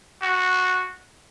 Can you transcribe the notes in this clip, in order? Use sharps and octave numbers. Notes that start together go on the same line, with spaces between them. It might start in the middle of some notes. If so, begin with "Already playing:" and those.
F#4